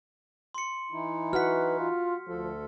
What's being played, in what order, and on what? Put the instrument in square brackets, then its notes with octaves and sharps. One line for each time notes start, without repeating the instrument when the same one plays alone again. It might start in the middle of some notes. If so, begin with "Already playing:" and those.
[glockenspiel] C6 C#7
[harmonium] E3 D#4 E4
[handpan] F#4 F#5 [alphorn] B4 [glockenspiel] F6 B6
[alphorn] F4
[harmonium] D2 A4 [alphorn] F3